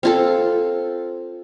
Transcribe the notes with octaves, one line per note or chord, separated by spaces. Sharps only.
C4 F4 A4